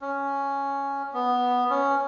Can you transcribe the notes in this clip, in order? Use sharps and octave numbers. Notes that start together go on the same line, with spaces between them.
C#4
B3
C#4